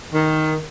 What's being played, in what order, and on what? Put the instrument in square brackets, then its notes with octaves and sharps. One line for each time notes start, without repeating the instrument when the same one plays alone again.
[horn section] D#3